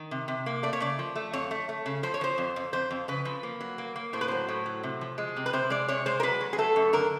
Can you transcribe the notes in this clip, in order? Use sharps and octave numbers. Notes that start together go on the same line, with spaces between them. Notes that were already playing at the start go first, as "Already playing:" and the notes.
Already playing: D#3
C3
C3
A#3
A3 D5
C#5
C#3 D5
F3
A3
F2 C#5
A3
A3
C#3
F3 C5
C#5
F3 C5
F2
F2
F2 C5
F2
C#3 B4
F3
A#3
F#3
A#3
A#3
A2 C5
B4
F#3 C5
A2
F#3
C3
F3
G#3
C3
B4
C3 C5
G#3 D5
C3 C#5
G#3 C5
A#4
F#3 B4
F#3
G#4
A3 A4
F#2
D3 A#4